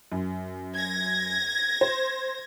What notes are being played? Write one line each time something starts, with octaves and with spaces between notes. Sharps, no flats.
F#2
G#6 A#6
C5